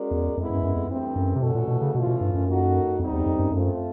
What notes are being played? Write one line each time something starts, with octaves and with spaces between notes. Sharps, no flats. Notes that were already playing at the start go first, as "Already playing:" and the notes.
Already playing: G#3 C#4 F#4 A#4 D5
E2
F2 G#3 B3 E4
F#2
F#2
F2
G2 E3 A3 C4
F#2
C3
B2 E3 A3 C#4 F#4 A4
A#2
B2
C#3
B2 E3 A3 C#4 F4
B2
G2
F#2
F#3 A#3 D#4 F#4 A4
F2 G3 C4 D#4
E2
F2
F#2
F#2 A3 C4 F4